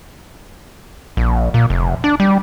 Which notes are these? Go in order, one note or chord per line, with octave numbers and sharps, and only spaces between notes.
A#1
A#2
F1
D4
G3